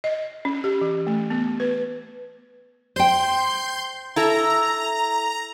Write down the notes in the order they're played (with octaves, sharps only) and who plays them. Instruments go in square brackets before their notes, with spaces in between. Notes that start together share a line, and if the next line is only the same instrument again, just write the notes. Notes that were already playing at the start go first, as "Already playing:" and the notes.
[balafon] D#5
C#4
G4
E3
A3
B3
B4
[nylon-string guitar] C5 G5 [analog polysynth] C6 G6
[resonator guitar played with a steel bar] E4 A4 E5 [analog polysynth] A#5